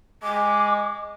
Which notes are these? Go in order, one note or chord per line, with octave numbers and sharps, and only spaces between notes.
G#3 D6